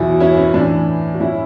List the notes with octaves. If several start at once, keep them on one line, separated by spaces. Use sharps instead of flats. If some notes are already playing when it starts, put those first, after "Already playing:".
Already playing: E2 B2 F#3 E4
C#4 E4
C#4
A2 E3 D4
F#4
A2 F#3 C#4 E4